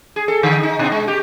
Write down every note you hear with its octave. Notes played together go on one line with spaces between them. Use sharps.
G#4
A4
D3
D#4
B2
G#3
G4